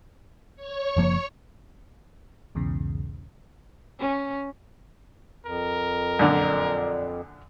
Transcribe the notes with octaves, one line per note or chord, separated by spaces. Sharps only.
C#5 C#6
F#1 F3 A#3
B1 E2 G#2 C#3
C#4
F2 A#4
F#2 A#2 D3 D5